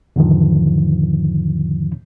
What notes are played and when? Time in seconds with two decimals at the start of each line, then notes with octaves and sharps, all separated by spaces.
0.16 E2 G#2 D3 D#3 F3